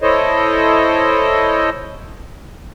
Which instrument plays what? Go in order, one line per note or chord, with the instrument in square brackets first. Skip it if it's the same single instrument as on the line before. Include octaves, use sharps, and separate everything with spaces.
[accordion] E4 A4 C5 C#5 D#5